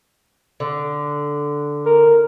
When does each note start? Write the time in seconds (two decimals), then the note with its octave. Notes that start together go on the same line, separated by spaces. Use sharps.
0.60 D3
1.86 A#4